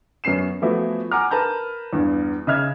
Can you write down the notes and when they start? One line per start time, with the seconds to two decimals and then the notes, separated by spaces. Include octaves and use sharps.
0.24 F#2 B3 C#4 C7 E7
0.62 E3 F3 A3 B3 E4 F#4
1.11 F#5 G#5 A#5 D6 F6
1.31 A#4 B4 A5 A#5 G6
1.93 E2 G2
2.47 C#3 D#5 E5 F6 G#6